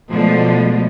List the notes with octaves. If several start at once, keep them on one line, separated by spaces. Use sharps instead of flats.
B2 D3 F3 G#3 A3